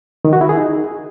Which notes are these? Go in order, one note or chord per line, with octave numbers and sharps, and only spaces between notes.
D#3
F#4
E4
G#4
D#4